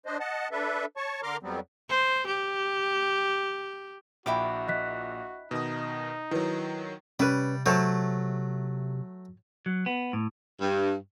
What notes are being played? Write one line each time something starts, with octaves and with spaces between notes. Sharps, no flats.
D4 C5 D#5
D#5 F#5 A5
D4 A4 B4 E5
C#5 A5 C#6
D3 A#4 A#5 C6 D6 F6
F2 F#3 G3 B3 C4
C5
G4
A#1 A#2 E4 F#4 G5 D6
D#5 F#6 B6
B2 D#3 D#4 D#6
D#3 F#3 E4 B4
C3 G3 C#4 B4
F#3 A3 C5 C#5 A5
F#3
B3
A2
G2